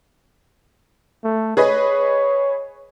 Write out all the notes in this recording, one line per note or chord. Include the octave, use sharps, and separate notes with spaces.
A3
G#4 B4 C#5 D#5